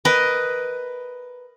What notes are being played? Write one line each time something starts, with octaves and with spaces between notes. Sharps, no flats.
A#4 B4 D#5